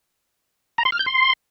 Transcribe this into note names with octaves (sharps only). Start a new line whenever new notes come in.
A#5
C6
F6
G6
C6